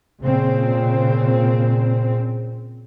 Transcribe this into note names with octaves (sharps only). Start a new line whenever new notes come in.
A#2 C#3 C4